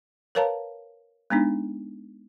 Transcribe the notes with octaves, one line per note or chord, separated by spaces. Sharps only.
A#4 B4 C#5 F5 A5 A#5
G#3 B3 D4 D#4